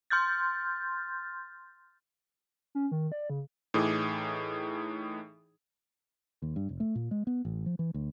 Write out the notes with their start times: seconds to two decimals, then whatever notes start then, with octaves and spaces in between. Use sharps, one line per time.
0.10 C6 F6 G6 A6
2.75 C#4
2.91 D#3
3.12 D5
3.30 C#3
3.74 A2 E3 D#4 G#4 D6 D#6
6.42 D#2
6.56 G2
6.69 F1
6.80 A3
6.95 A#2
7.11 G#3
7.27 B3
7.45 A1
7.66 F3
7.79 E3
7.94 D2